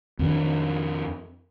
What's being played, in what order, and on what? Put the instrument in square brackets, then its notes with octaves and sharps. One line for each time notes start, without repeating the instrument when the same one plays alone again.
[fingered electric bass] F2 D#3 D4